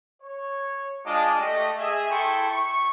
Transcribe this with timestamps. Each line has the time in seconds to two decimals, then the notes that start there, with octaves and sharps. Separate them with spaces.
0.22 C#5
1.05 G#3 D4 F4 D#5 A5 D6
1.39 A3 G4 D#5
1.78 G#4 E5
2.10 E4 A4 G5 C6 C#6
2.49 C#6